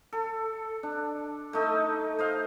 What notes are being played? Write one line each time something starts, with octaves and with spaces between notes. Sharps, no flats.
A4
D4
A3 D#4 A4
C5 D#5 F5